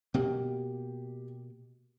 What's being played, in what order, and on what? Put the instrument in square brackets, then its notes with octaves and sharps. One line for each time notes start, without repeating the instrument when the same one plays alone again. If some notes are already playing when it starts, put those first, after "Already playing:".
[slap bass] B2 A#3 [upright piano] G4